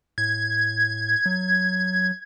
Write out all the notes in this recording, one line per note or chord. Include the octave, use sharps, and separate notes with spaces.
A2 G#6
F#3